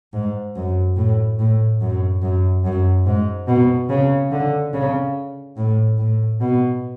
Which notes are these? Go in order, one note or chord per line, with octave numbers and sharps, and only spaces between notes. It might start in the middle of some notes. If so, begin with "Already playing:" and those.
G#2
F#2
A2
A2
F#2
F#2
F#2
G#2
B2
C#3
D3
C#3
A2
A2
B2